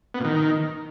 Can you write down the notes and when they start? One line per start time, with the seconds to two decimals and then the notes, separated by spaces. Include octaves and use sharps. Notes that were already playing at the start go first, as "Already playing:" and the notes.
0.14 B3
0.20 A#2
0.25 D#3